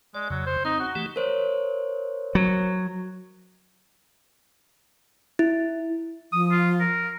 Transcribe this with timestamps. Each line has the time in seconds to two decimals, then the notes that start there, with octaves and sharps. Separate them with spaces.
0.15 G#3 D5
0.30 F2 C#3 F#3
0.46 C5
0.65 C4 D#4
0.80 F#4
0.95 E3 A3 G4
1.16 A#4 C5 C#5
2.35 F#3
5.39 E4
6.33 F3 D#6
6.51 F4
6.80 A#4